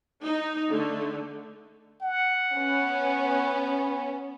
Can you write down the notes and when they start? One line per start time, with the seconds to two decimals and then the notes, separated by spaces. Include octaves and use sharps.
0.22 D#4
0.69 D3 A3
2.02 F#5
2.56 B3 C#4